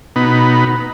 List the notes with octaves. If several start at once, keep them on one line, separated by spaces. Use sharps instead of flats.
B2 B3 D#4 B5